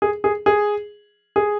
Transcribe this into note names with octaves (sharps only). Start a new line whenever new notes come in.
G#4
G#4
G#4
G#4